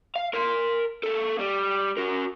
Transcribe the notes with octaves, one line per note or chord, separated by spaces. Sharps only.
F5
A#4 C6
A#3 A4
G3
F#4 A#4